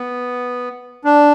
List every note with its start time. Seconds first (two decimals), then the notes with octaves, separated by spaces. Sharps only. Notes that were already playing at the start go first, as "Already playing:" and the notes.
Already playing: B3
1.05 D4